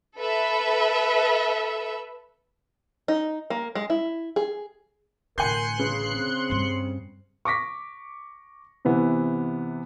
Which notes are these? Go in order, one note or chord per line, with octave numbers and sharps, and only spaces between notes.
A4 B4 E5
D#4
A#3
G#3
E4
G#4
A1 D3 A#4 G#5 C6 F#6 G6 C#7
C#3 B4
C4
G2 G3
C#6 D6 A#6 B6
C3 E3 B3